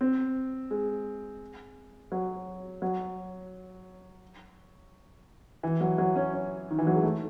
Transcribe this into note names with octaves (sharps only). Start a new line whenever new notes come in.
C4
G#3
F#3
F#3
E3
F#3
F#3
C#4
C#4
D#3
E3
F#3
G#3
A3